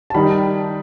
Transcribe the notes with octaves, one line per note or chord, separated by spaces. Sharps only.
A5
D#3 G3 D#4 B5